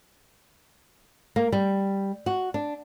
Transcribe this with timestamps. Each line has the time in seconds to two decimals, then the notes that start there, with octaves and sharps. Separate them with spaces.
1.36 A#3
1.52 G3
2.26 F#4
2.54 D4